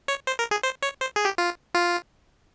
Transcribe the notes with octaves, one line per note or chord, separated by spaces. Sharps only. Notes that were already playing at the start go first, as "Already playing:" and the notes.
C#5
C5
A#4
G#4
C5
C#5
C5
G#4
G4
F4
F4